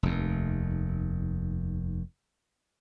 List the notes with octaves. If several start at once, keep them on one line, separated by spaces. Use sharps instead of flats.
F1 D#2